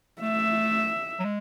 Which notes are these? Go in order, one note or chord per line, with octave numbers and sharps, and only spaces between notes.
A3 E5
F#3
G#3